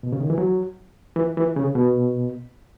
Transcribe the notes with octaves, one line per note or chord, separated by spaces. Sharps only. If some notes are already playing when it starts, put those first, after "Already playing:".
B2
C#3
D#3
E3
F#3
E3
E3
C#3
B2